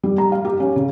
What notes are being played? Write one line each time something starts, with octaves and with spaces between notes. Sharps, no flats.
G3
A#5
F5
G4
C#4
C#3